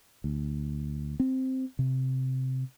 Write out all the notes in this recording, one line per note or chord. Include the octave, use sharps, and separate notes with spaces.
D2
C4
C3